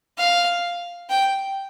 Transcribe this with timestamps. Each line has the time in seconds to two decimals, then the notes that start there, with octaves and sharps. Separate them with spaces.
0.18 F5
1.09 G5